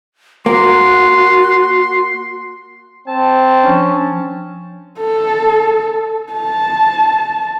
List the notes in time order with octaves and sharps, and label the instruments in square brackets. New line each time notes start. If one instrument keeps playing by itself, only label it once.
[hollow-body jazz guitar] A#3 [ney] F#4 [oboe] C6
[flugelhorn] C4 [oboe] A5
[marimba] F3 D4 [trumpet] C#4
[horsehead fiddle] A4
A5